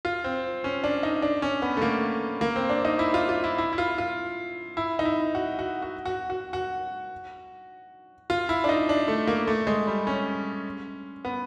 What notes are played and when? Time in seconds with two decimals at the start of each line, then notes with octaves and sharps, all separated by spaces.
0.05 F4
0.24 C4
0.64 C#4
0.84 D4
1.03 D#4
1.22 D4
1.42 C#4
1.62 B3
1.77 A3
1.82 A#3
2.41 A#3
2.56 C4
2.70 D4
2.85 D#4
2.99 E4
3.14 F4
3.29 F4
3.44 E4
3.58 E4
3.73 E4
3.78 F4
3.98 F4
4.77 E4
4.99 D#4
5.05 E4
5.35 F#4
5.59 F#4
5.82 F#4
6.06 F#4
6.30 F#4
6.53 F#4
8.30 F4
8.49 E4
8.64 D4
8.69 D#4
8.89 D4
9.08 A3
9.28 A#3
9.47 A3
9.67 G#3
9.87 G3
10.07 C#4
11.25 B3